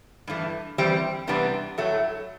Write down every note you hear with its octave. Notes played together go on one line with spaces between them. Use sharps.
G2 E3 A3
E3 G3 C4 G4
C3 E3 G3 B3 D4
A2 F#3 A3